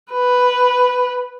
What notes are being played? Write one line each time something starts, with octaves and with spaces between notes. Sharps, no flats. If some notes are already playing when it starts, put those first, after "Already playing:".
B4